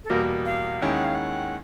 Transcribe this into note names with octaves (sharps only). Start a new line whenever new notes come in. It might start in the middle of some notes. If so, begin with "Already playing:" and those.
A4
E2 B2 G3 A#3 A#4
F5
D#2 D#3 G#3 C#4 E4 G5
F#5
F5
F#5